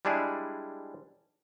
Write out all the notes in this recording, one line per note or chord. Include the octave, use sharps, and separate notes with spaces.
G3 G#3 D4 E4 G#4